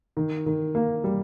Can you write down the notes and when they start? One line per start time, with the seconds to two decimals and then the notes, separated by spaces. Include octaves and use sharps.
0.17 D#3
0.46 D#3
0.75 A#3
1.04 G3